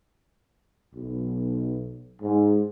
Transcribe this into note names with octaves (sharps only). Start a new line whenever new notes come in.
B1
G#2